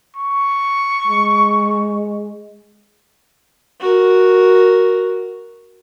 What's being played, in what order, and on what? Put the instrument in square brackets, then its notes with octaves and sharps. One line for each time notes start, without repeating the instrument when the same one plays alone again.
[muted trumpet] C#6
[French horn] G#3
[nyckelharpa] F#4 A#4